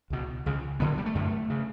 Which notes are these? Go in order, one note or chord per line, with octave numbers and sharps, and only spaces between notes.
C#2 B2
C#2 C#3
D2 D3 B3
G3
A3
F#2 D3
C#3